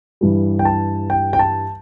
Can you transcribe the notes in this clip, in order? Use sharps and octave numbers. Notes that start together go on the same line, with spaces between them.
G2 E3 G3
G5
A5
G5
G5
A5